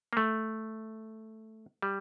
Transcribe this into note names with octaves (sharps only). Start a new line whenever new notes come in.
A#3
A3
G3